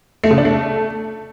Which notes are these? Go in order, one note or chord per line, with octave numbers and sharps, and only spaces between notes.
A3
C#3
D4
A3